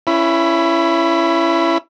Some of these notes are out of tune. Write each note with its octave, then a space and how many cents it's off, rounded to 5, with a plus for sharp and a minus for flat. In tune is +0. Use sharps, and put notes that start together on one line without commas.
C#4 +0 E4 +25 B5 +0